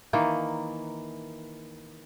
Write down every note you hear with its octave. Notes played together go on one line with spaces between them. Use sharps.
D#3 E3 A#3